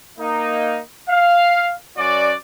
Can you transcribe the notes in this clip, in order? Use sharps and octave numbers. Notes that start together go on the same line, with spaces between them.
A#3 D#4
F5
F#2 C#4 F#4 D5